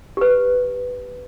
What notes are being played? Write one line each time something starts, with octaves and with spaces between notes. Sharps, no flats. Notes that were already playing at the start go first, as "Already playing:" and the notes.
G4 B4